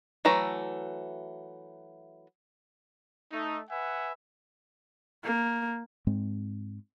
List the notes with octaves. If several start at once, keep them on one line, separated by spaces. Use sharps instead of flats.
E3 F#3 A3 A#5
A3 D#4
B4 E5 F#5 G#5
A#3
G#2 G#3 C4